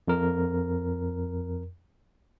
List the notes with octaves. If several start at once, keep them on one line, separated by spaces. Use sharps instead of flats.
F2 A#4